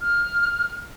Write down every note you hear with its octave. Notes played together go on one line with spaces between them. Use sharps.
F6